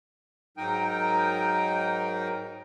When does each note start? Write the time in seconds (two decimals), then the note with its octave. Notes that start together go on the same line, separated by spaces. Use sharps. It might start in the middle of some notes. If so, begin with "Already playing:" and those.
0.57 G#2 F#3 D#4 A#4 G5 D#6